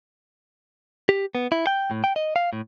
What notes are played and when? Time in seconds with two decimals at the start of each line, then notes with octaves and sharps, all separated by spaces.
1.09 G4
1.35 B3
1.52 E4
1.67 G5
1.91 A2
2.04 G5
2.16 D#5
2.36 F5
2.53 A2